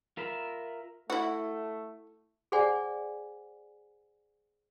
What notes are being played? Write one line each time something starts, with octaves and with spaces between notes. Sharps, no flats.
F4 A#4 E5 B5
A3 E4 F#4
G#4 C5 D5 F#5 G#5